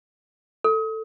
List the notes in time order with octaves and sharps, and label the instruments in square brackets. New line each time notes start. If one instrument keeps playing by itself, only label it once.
[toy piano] A4